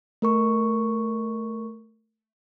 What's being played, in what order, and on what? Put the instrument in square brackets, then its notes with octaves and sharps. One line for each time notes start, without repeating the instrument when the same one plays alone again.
[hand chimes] A3 A#4 C#6